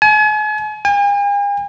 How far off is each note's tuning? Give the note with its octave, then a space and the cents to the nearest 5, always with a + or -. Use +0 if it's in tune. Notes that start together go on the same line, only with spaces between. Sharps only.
G#5 +40
G#5 -45